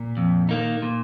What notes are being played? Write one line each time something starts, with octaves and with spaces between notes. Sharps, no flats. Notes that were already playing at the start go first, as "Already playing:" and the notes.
Already playing: A#2
F2
D#3 A#3 D#4
A#2